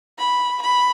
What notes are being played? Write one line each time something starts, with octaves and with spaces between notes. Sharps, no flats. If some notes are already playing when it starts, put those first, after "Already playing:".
B5
B5